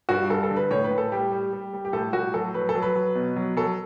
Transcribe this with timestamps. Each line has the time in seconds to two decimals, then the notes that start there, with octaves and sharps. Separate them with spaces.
0.09 G2 F#4
0.30 G2 A4
0.43 A4
0.51 D3
0.56 B4
0.71 A2 C#5
0.84 B4
0.91 A2
0.98 A4
1.12 G3 G4
1.32 G3
1.53 G3
1.73 G3
1.85 G4
1.93 A2 A4
2.13 A2 F#4
2.34 F#3 A4
2.54 F#3 B4
2.69 A4
2.75 F#3
2.82 B4
2.95 F#3
3.15 B2
3.36 F#3
3.57 F#3 A4